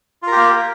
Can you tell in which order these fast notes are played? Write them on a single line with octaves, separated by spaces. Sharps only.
F4 A#4 G4 A#3